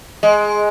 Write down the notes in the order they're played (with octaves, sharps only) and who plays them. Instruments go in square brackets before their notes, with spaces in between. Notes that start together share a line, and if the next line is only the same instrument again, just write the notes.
[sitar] G#3